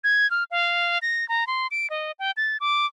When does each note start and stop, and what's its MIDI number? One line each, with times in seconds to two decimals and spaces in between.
0.04 0.29 92
0.31 0.44 89
0.51 0.98 77
1.02 1.27 94
1.29 1.47 82
1.47 1.67 84
1.71 1.89 98
1.90 2.12 75
2.19 2.31 79
2.37 2.57 93
2.60 2.86 86